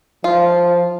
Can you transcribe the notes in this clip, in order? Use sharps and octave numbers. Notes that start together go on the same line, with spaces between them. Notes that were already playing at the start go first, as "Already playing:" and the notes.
F3 F4